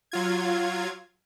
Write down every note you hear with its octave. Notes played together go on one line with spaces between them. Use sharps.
F#3 F4 G#6